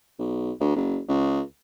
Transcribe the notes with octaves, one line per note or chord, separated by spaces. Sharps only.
B1
D2
F#1
C#2